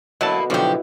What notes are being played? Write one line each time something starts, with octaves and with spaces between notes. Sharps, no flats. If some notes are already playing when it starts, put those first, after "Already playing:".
B2 D3 F#3 A#3 B3 E4 A5
B1 D3 F3 B3 E4 F#4 G4